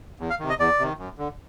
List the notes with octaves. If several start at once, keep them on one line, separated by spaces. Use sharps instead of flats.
E2
F5
C3 D#3
D#5
E2 D5
C3 D#3
F#2
D3